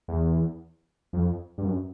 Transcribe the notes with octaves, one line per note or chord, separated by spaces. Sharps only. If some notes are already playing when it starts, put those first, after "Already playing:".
E2
F2
G2
F#2